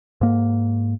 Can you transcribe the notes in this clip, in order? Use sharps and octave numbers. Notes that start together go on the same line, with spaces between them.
G#2 A#3